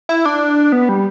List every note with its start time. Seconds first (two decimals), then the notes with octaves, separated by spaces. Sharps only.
0.09 E4
0.25 D4
0.72 B3
0.89 G3